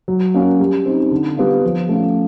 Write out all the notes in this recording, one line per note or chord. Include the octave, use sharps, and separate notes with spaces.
F#3
A#3 C#4 F#4
G3
C4 D#4
D3
G3 B3 D4 F4
F3
A3 C#4 F4